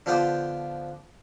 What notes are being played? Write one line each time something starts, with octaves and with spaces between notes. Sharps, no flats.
D3 F3 B3 G4 B4 C5